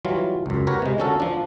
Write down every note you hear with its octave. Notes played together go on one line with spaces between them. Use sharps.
E3 F#3 G3 F4
C#2 F#2
G4 A#4 B4 C#5 F#5
C3 G#3
D3 F3 C#4 F#4 A4 A#4
F3 D4